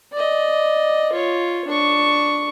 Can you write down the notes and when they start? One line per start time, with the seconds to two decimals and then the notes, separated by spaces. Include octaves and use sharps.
0.13 D5 D#5
1.12 F4 C#5
1.67 D4 C#6